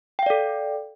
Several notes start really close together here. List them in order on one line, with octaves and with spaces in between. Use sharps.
G5 F5 D5 A4